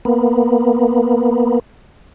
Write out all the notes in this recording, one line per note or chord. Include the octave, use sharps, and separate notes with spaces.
A#3 B3